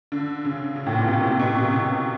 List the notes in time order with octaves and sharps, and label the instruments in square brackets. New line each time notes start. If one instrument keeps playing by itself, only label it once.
[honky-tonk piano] D3
C#3
C#3
A2
A#2
B2
C3
C3
B2
C3
C#3